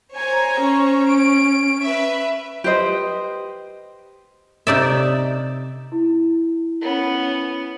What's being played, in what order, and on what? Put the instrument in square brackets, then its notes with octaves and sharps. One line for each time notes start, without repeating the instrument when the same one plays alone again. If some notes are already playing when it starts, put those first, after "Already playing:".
[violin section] C5 C#5 A#5 [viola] G#5
[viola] C#4
[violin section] D7
B4 E5
[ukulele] G4 B4 C5 D#5
[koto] C3 D#4 D5 E5
[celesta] E4
[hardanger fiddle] B3 C#4